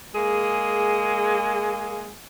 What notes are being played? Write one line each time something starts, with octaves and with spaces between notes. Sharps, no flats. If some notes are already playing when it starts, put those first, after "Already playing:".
G#3 A#3 G#4